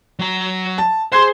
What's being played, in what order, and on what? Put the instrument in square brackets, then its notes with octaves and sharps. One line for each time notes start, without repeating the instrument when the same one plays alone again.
[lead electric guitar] F#3 A#5
[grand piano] A5
[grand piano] G#4 G#6 C7 [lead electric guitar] C5 [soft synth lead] C6